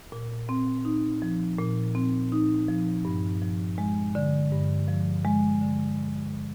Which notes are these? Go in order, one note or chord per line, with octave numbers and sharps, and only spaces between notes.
A#2
C4
D#4
F3
A#2
C4
D#4
F3
G2
F3
G#3
D3
G2
F3
G#3
D3